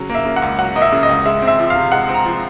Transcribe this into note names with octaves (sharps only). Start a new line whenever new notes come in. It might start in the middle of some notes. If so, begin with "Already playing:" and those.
Already playing: C#3 F#3
A#3
E5
C#3
F#5
C#2
F#3 F#5
A#3 D#5
E5
C#3
D#5
C#2
G#3 E5
C4
E5
F3
F5
C3
G#3 F#5
C4
A#5
F3